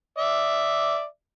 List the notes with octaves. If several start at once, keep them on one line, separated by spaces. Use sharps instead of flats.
D5 E5